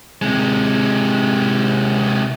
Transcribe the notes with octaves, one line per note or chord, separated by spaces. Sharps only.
C3 G#3